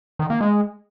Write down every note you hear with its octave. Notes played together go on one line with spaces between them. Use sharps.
D#3
A#3
G#3